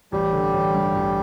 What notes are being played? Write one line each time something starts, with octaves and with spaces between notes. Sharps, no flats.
A1 G3 G4
D3
A1
G2
A1